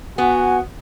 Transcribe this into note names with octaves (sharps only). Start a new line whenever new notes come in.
B3 F#4 G#5